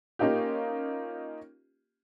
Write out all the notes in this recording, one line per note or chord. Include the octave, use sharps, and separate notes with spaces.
A#3 C#4 D#4 F4 G4